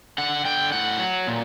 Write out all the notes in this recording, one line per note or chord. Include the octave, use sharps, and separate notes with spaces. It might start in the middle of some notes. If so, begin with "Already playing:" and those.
D3 F#5
D3 G5
A2 F#5
F#3
A#2